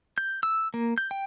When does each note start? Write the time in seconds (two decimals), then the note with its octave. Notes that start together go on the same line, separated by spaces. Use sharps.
0.18 G6
0.43 E6
0.74 A#3
0.98 G6
1.11 G5